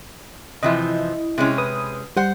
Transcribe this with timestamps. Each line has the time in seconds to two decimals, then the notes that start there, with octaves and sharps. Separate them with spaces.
0.63 C3 E3 F3 E4 D#5
1.38 C3 G#3 C#4
1.58 B4 D#6
2.16 G3 C5 F#5